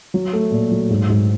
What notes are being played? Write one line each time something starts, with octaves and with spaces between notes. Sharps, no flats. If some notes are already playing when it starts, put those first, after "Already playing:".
F#3
A3
A#2
F#3
G#2
G#2